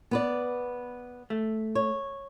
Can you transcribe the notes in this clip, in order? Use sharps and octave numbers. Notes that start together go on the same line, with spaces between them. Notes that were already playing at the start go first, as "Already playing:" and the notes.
B3 B4 D5
A3
C#5